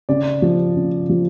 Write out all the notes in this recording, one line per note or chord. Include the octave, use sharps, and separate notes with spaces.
C#3 D5
F3
C#3
F3